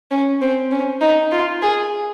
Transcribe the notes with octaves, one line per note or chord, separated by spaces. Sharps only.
C#4
C4
C#4
D#4
F4
G#4